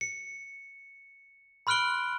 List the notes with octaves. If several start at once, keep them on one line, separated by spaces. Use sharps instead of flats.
C#7
B5 C6 F6 F#6 D7 G7